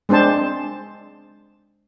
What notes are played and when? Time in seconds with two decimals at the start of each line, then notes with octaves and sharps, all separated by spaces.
0.09 G#3 C4 D4 C5 A5